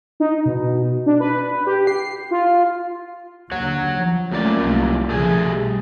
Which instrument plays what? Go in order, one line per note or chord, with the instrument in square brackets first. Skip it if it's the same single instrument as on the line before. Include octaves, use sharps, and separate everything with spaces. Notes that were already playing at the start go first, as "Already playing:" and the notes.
[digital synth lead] D#4
B2
D4
B4
G4
C7
F4
[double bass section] D#2 D3 [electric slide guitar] C#5 F#5
[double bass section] F3
[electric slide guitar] F#2 A#2 D5 [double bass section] A3 A#3 C#4
[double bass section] C2
[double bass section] B1 C#3 F3 [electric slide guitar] A3 G#4 G#5
[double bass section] B2 G3